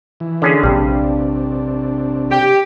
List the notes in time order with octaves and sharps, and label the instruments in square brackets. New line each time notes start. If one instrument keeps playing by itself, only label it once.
[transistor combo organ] E3
[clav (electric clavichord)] D3 C#4 G#4
[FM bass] A#1 [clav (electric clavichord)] G2 G3 [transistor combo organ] C3 D4
[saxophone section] G4